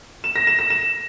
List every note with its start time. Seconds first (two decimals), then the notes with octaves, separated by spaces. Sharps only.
0.24 E7
0.36 A#6
0.47 E7
0.59 A#6
0.70 E7